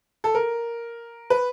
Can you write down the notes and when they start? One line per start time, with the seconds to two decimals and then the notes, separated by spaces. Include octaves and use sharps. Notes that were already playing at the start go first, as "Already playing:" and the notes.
0.24 A4
0.35 A#4
1.30 B4